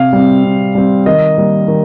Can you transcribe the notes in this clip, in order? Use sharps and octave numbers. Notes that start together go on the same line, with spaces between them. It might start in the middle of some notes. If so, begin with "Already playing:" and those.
Already playing: C3 F5
G3 C4
C3
G3 C4
D#3 D#5
G3 A#3
D#3